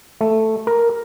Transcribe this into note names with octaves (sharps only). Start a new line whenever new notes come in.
A3
A#4